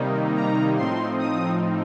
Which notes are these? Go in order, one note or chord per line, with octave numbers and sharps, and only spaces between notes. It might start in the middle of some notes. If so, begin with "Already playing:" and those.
Already playing: C3 D#3 G3 A#3 D#4
A#5
A2 F3 C4 D#4 C6
D#6